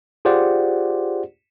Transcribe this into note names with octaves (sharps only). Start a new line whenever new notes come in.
F4 G4 G#4 C5 D5 F#5